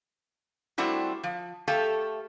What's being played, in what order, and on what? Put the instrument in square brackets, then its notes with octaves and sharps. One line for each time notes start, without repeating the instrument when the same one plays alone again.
[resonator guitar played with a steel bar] G3 A3 C4 D4 E4 F#4
F3
A3 G4 A4 F5